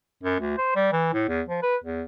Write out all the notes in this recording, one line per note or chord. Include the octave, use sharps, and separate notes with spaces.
F#2
D2
C5
G3
E3
A2
E2
F3
B4
E2